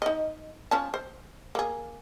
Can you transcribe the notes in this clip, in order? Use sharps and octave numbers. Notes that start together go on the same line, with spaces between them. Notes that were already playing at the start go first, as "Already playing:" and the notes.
D#4 D#5
F3 C#4 A5
C5
A#3 G#4